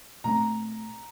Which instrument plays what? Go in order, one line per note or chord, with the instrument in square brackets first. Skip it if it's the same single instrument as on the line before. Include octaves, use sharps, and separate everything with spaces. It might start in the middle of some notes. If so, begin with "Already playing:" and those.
[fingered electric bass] A#2 A3 C4 [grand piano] A#5